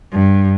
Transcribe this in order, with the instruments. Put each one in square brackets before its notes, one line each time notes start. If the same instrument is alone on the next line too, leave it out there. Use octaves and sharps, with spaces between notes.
[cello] G2